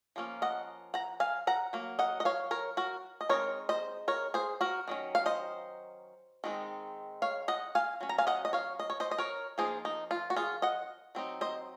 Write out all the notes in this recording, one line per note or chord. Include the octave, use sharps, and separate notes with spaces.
F3 A#3 C#4
D#5 F#5
F#5 A#5
F5 G#5
F#5 A#5
F#3 A#3
D#5 F#5
D#5
C#5 F5
A#4 C#5
F#4 A#4
D#5
G#3 C4 D#4 A#4 C#5
C5 D#5
A#4 C#5
G#4 C5
F#4 A#4
D#3 F#3 C#4
F5
C5 D#5
D#3 G#3 C4 D#4
C#5 F5
D#5 F#5
F5 G#5
F#3 C#4
A#5
F5 G#5
D#5 F#5
D#5
C#5 F5
D#5
C#5
C5 D#5
D#5
A#4 C#5
F3 A#3 D#4 G#4 C5
D#4
F4
F#4
F4 G#4
D#5 F#5
F#3 C4 D#4
C5 D#5